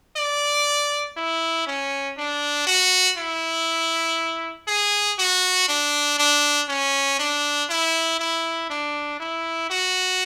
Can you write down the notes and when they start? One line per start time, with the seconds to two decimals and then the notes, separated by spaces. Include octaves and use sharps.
0.17 D5
1.17 E4
1.67 C#4
2.17 D4
2.67 F#4
3.18 E4
4.68 G#4
5.19 F#4
5.69 D4
6.19 D4
6.69 C#4
7.19 D4
7.70 E4
8.20 E4
8.70 D4
9.20 E4
9.70 F#4